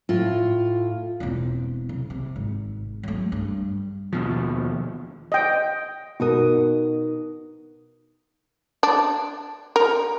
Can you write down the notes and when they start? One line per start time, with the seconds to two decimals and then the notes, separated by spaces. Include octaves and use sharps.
0.09 A2 F4
1.20 E1 C4
1.89 C3
2.10 C3
2.36 G#1
3.03 F#3 A3
3.32 G2
4.13 D#2 B2 F3
5.32 D#5 G5
6.20 B2 D#4 F#4 A#4 D#6
8.83 D4
9.76 A#4